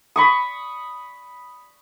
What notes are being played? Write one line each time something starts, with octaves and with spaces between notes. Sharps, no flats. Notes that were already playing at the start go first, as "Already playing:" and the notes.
B5 C#6 D#6